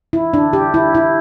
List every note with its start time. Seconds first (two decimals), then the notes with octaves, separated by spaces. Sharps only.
0.13 E4
0.33 D4
0.53 G4
0.74 E4
0.95 E4